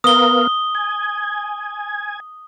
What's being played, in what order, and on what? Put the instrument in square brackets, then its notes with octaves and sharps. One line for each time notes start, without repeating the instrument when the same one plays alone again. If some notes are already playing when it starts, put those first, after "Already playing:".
[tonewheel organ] B3 A#4 F5 [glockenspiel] D#6 G7
[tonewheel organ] G#5